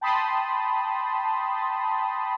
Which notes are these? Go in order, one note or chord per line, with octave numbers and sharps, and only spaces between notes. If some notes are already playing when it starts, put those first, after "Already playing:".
G5 A5 B5 C6 D#6